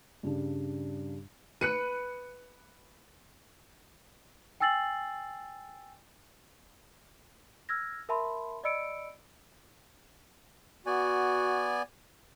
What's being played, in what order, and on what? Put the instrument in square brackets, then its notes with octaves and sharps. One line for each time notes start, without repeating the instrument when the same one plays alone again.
[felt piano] G2 C#3 G3 D4
[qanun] B4 [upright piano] F#6 C#7 D#7
[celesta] G5 G#5 E6 A6 C7 F#7
E6 F6 G#6 A#6
A#4 E5 A5 B5 C6
D5 D#5 B5 E6 C#7 D7
[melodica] B3 D5 G#5 [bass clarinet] F#4